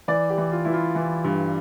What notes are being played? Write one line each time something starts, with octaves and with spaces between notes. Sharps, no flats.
E3 D5
G4
E3
F4
E3 E4
F4
E3
G2